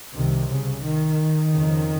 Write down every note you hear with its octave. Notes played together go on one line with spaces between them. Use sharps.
C2 C3 D#3
C#3
D#3
F2 C#3